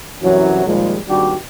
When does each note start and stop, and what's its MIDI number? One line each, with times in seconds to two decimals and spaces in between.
0.22 0.65 36
0.22 0.65 42
0.22 0.65 52
0.22 0.65 54
0.66 0.98 39
0.66 0.98 46
0.66 0.98 53
0.66 0.98 55
0.66 0.98 56
1.09 1.35 32
1.09 1.35 39
1.09 1.35 55
1.09 1.35 62
1.09 1.35 66
1.09 1.35 67